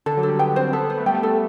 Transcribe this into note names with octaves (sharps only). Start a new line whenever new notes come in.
D3 A4
F#3
A4
G3
B3 G5
C4 C5
B3 A4
B3 C5
A3
G3 G5
A3
A4